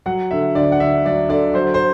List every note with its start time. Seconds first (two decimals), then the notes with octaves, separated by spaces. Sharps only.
0.06 F#3 F#5
0.31 D3 E5
0.55 D2 D5
0.72 F#5
0.80 D2 E5
1.05 F#3 D5
1.29 D3 D5
1.54 F#3 C5
1.74 C5